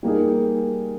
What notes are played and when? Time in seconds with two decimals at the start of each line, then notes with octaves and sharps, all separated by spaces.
0.03 G3 A#3 D#4 G#4